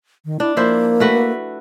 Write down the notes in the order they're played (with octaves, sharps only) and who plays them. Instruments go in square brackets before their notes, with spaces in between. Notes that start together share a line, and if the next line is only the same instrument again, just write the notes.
[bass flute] D#3
[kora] D4 [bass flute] E4
[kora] F3 E4 C5 [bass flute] A#3
[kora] A3 F#4 B4